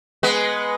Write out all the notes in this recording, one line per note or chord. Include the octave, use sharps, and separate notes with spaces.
G#3 B3